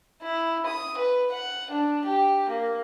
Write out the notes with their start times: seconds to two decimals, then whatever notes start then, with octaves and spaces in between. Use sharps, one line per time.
0.22 E4
0.66 D#6
0.98 B4
1.32 F#5
1.71 D4
2.05 G4
2.49 A#3